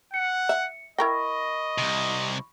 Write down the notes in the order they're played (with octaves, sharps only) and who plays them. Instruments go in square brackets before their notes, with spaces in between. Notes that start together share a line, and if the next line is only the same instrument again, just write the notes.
[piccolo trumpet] F#5 [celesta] C#7
[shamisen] E5
[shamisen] E4 A#4 G5 [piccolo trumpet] D#5 [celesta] B5 C#6 A#6
[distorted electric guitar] C2 C3